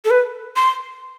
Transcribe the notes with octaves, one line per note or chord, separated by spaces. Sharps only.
A4
B4
C6